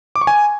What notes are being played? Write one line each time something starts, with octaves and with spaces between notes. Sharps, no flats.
D6
C#6
G#5